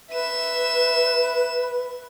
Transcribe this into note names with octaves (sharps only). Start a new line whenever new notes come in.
B4 E5 E7